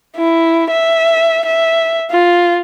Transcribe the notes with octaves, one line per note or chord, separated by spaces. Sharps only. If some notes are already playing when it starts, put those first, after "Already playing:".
E4
E5
E5
F4